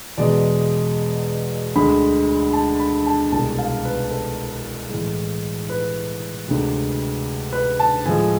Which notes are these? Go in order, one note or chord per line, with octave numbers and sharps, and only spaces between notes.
E2 B2 G#3 D5
D2 D3 G#3 B5
A5
B5
A5
C2 B2 G#3 A5
F5
B4
A4
A2 E3 G#3
B4
D2 C3 G#3
B4
A5
A2 F3 G#3 G#5